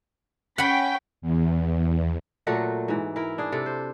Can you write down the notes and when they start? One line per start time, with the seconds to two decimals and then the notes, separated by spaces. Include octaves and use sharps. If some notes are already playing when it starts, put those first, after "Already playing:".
0.58 C#4 F#5 G5 B5 B6
1.22 E2
2.47 A#2 F#3 A3 F#4
2.88 G#2 E3
3.16 E4 A#4
3.38 D4 G#4
3.52 C3 A4
3.66 C5